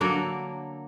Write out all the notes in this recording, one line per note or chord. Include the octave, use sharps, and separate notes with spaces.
D3 F#3 A#3 A4